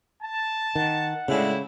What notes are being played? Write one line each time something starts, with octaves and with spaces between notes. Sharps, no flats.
A5
D#3 F#5
A2 C#3 G3 G#3 D4 E4